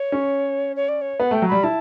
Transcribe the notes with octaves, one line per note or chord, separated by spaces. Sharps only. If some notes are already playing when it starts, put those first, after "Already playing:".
Already playing: C#5
C#4
C#5
D5
C#5
B3 F#5
A3 G5
F#3
G3 B5
E4 A5